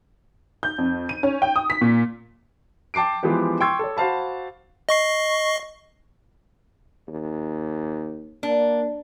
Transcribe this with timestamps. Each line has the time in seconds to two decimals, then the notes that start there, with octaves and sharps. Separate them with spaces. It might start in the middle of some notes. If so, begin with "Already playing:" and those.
0.63 G6
0.78 F2
1.09 D#7
1.23 C#4
1.42 G5
1.56 D#6
1.70 B6
1.81 A#2
2.94 G5 A5 D6 C7 D7
3.23 E3 F3 G#3 B3 G4
3.61 G5 C6 C#6 E6 G#6
3.79 A4 C#5
3.97 F#4 C5 F5 A5 B5
4.89 D#5 C#6 C7
7.08 D#2
8.43 A#3 D4